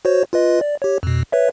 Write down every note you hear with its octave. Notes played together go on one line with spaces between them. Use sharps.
F#4 C5 C#5
F4 B4 D#5
D5
G4 C#5
F2 B2
B4 C#5 E5